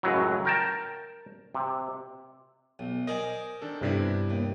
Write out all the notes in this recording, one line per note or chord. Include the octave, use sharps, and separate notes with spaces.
C#2 F#2 A2 F#3
A#4 G5 A5
C3
B1
A#4 C5 D5 D#5 G#5
D#3 D4 A4
G2 C3 B3 D4 E4
D#2